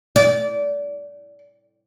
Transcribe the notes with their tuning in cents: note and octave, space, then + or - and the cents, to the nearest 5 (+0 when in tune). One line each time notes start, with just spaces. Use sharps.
D5 -25